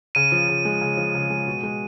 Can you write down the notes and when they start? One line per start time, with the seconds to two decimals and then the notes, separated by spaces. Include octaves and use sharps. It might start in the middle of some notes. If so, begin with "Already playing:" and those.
0.15 C#3 D#7
0.32 F3
0.49 C#3
0.65 G#3
0.81 C#3
0.97 F3
1.15 C#3
1.30 G#3
1.47 B2
1.63 G#3